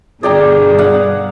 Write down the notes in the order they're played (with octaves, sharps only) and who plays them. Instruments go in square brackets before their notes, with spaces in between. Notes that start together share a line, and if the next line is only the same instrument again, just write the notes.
[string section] G2 B2 D3 [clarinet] G#4 [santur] D5 G5 A#5
[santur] F5 F#5